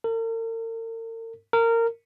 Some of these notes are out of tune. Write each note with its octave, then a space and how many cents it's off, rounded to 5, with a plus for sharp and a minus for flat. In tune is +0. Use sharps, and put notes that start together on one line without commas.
A#4 -45
A#4 -20